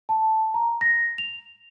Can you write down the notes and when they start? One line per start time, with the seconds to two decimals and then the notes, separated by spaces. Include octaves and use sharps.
0.09 A5
0.54 A#5
0.81 A#6
1.18 F7